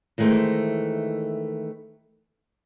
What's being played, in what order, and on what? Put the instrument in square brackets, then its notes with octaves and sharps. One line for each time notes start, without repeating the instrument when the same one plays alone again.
[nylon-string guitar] D#3 E3 G#3 A3 A#4 C5